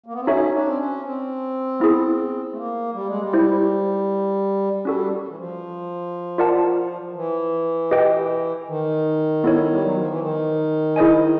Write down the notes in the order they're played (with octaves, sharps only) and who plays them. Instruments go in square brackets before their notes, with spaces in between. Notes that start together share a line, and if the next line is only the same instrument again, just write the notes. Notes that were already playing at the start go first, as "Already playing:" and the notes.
[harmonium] A#3
B3
C4
[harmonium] C#4 [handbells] D#4 F#4 A4 C#5 E5
[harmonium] D4
C4
C#4
C4
[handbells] B3 E4 G#4
[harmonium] A3
A#3
G3
G#3
G3
[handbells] E4 G4 C5
[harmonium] G3 [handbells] C#4 F#4 A4
[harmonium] E3
F3
[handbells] F4 A#4 D5 F#5 A5
[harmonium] E3
[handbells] G4 B4 D#5 G5
[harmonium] D#3
[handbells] B3 E4 A4 C#5
[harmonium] G3
F#3
F3
E3
D#3
[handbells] E4 G#4 C5 D#5 G#5